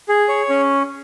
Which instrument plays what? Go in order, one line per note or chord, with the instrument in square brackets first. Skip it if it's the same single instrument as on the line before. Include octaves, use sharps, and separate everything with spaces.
[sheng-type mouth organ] G#4
C#5
C#4